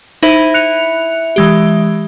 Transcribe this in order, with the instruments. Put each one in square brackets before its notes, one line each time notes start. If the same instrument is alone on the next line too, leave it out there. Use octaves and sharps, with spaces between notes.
[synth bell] D#4 C5 [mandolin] E4
[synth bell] F#6 C#7 F7
E3 G#3 G4